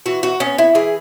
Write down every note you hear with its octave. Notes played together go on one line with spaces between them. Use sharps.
E3 F#4
F#4
B3 C#4
E4
E3 G#4